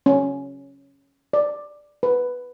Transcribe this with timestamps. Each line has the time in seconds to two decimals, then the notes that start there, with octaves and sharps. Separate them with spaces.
0.06 C#4
1.33 D5
2.03 B4